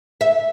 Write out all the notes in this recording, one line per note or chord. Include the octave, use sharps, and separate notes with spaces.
E5